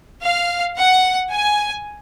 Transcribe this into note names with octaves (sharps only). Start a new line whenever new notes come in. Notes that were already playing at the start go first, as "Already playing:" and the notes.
F5
F#5
G#5